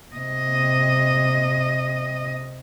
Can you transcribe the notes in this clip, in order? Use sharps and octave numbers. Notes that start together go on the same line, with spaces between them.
C3 D#5